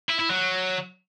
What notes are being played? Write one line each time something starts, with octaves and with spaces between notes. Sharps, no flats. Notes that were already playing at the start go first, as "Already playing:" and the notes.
E4
E4
F#3